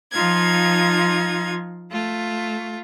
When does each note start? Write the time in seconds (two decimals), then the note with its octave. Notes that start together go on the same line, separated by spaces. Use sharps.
0.12 F3 D#4 F4 C6 G#6
1.92 A3 F4